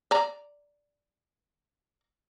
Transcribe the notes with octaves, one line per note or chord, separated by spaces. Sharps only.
D5 A#5